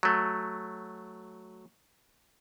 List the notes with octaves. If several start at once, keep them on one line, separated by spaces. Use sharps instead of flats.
F#3 A3